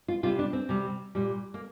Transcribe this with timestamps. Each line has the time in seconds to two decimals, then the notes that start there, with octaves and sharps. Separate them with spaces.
0.08 F4
0.23 C3 G3 F4
0.39 D4
0.53 C4
0.69 C3 G3
1.15 A#2 G3
1.54 A#3